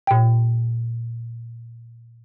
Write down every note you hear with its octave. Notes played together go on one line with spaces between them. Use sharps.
A#2 G5